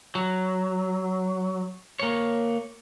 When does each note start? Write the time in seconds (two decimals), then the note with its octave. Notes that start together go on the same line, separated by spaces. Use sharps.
0.15 F#3
2.00 A#3 C#5